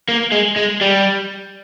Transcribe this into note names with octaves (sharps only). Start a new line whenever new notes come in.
A#3
G#3
G#3
G3